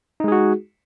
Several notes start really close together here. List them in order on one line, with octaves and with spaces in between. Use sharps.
D#4 G#3 G#4 F#4